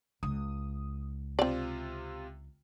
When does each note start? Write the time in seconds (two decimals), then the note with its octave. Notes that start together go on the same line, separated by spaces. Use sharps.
0.23 C#2 D#6
1.39 C3 C4 F4 D5